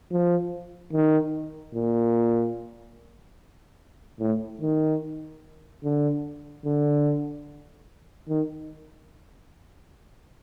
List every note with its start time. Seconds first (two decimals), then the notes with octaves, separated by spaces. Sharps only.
0.11 F3
0.93 D#3
1.74 A#2
4.20 A2
4.62 D#3
5.84 D3
6.65 D3
8.29 D#3